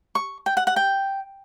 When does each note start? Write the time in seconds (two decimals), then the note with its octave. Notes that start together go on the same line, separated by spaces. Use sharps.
0.15 C#6
0.46 G5
0.57 F#5
0.67 F#5
0.76 G5